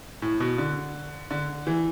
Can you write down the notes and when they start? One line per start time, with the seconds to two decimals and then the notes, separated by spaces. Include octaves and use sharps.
0.22 A2
0.40 B2
0.58 D3
1.31 D3
1.67 E3